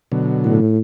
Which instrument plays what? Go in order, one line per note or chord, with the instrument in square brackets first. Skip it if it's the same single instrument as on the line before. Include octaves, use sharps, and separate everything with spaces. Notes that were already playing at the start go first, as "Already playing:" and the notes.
[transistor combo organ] B2 D3 F#3
[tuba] A2